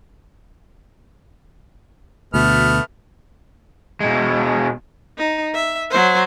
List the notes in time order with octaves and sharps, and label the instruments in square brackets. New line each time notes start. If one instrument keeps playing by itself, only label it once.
[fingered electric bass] D2 B2 [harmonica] A3 B3 F6
[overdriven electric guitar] B2 G#3
[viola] D#4
E5
F#3 C5